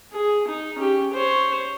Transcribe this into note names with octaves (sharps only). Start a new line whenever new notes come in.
G#4
D#4
C#4 G4
C5 C#5